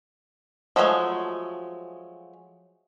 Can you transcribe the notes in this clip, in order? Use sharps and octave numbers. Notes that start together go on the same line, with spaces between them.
F3 F#3 G#3 A3 G#5